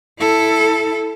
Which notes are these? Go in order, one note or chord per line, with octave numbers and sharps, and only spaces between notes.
E4 A4